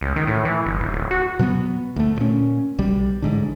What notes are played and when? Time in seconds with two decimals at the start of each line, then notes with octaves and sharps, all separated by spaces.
0.01 C#2
0.16 D#3
0.27 A2
0.45 E3
0.66 G1
0.80 D#1
0.92 D1
1.11 F#4
1.39 B2 F#3 A#3 B3
1.96 D2 A3
2.16 A#2 C#4
2.78 B1 G3
3.22 A1 G#2 D3